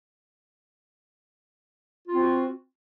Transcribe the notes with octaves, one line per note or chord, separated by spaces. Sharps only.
C4 F4 F#4